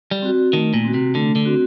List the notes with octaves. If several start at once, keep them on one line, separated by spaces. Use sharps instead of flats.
G3
C4 F#4
D#3 A3
A#2
C4 F#4
C3
D3 A3
D3
C4 F#4